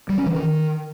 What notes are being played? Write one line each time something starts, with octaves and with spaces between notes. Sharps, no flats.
G3
C#4
E3
D#3